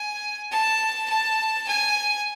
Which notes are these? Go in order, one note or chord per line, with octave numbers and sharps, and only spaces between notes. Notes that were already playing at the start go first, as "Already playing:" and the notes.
Already playing: G#5
A5
A5
G#5